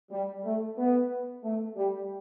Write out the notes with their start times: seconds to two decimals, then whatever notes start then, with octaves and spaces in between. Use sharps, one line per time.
0.11 G3
0.44 A3
0.77 B3
1.44 A3
1.76 G3